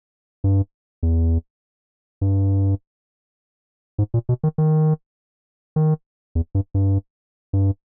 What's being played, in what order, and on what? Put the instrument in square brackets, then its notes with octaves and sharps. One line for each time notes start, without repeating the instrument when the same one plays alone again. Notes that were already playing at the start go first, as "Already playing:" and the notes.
[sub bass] G2
E2
G2
G#2
A#2
B2
D#3
D#3
D#3
E2
G2
G2
G2